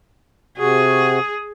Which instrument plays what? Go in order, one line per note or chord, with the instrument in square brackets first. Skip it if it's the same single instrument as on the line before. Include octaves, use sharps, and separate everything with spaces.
[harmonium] C3 F#4 [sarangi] G#4